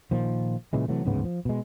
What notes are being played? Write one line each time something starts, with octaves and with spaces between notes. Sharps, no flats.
A#2 D#3 F3
A#2 C#3 E3 G#3
C3 E3 F#3 A3
D1 G#2 C#3 B3
F3
B2 G#3